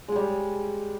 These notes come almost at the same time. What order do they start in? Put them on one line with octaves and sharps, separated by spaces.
G#3 G#4 G3